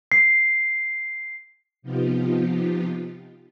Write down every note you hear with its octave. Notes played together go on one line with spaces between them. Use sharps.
C7
C3 F3 B3 D#4 F4 G4